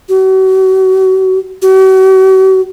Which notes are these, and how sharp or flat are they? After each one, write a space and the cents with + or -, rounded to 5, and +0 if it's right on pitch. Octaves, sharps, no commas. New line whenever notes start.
F#4 +40
F#4 +45